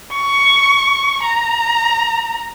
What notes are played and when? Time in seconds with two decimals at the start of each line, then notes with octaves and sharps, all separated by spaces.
0.12 C#6
1.23 A#5